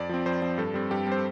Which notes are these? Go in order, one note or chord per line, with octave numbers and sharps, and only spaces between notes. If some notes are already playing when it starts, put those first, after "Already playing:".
Already playing: F2 D5
F3 C4
F2 C5
F3 C4
G2 A4
G3 C4
G2 G4
G3 C4 C5